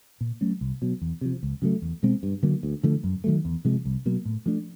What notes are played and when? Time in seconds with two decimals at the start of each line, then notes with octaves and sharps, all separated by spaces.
0.21 A#2
0.41 F#3 A3 C#4
0.61 C2
0.82 B2 F#3
1.01 E2
1.21 C3 F3
1.43 C#2
1.62 C#3 F#3 A3
1.82 E2
2.03 B2 G#3 C4
2.23 G2
2.43 D3 F#3 A#3
2.63 D2
2.83 D3 F3 A3
3.04 F#2
3.24 D#3 F#3 A3
3.45 E2
3.65 C3 F3 G#3
3.85 C2
4.06 B2 F#3 A#3
4.25 A2
4.46 F3 A3 D4